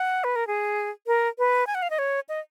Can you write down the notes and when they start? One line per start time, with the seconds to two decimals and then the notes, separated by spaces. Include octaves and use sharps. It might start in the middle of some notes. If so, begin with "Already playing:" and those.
Already playing: F#5
0.24 B4
0.36 A#4
0.47 G#4
1.07 A#4
1.39 B4
1.67 G#5
1.75 F#5
1.82 F5
1.90 D#5
1.99 C#5
2.29 D#5